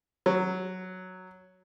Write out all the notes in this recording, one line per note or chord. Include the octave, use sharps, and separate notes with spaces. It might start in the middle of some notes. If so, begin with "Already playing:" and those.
F#3